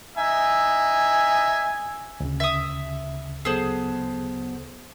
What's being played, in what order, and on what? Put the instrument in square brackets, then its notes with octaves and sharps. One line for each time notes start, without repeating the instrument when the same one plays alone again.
[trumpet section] D#4 E5 G#5
[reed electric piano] D2 C#3
[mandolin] E5 D#6
[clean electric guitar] F#3 B3 A4 [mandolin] G#4 C5